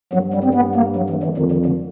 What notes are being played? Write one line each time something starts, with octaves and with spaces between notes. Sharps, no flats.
G2 F#3
G3
C4
B3
A#3
F#3
E3
E3
F2 D#3
D#3
D3